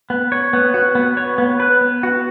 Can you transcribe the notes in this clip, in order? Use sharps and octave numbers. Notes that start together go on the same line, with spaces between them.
B3
C#5
B3
F#4
B3
C#5
B3
B4
B3
F#4